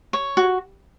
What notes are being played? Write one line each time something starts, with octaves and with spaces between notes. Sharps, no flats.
C#5
F#4